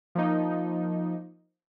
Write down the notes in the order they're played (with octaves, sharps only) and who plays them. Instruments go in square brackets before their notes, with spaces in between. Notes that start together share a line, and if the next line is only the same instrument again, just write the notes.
[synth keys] F3 A#3 D#4